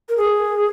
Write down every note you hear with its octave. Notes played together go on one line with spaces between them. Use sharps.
A#4
G#4